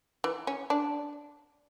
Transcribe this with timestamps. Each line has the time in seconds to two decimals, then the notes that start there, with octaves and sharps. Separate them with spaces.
0.24 E3
0.47 C#4
0.70 D4